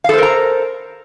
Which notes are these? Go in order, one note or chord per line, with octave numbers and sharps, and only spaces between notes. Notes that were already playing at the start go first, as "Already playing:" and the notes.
A4 A#4 C5 F5 A#5